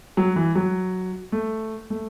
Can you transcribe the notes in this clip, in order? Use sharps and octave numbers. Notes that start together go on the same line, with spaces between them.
F#3
E3
F#3
A3
A3